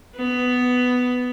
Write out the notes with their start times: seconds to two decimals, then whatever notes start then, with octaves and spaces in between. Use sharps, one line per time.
0.17 B3